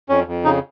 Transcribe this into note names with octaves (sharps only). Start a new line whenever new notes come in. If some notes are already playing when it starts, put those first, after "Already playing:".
F2 C#4
F2
C#3 D#4